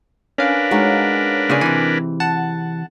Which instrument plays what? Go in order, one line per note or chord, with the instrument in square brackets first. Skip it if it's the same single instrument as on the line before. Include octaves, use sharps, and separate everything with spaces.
[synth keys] C#4 F5 [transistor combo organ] D4 A#4 B4
[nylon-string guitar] G#3 D#4 F#4
[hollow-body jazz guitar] A#2 C#3 G#4
[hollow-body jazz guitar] C3 E3 [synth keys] G#5
[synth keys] F#5 A5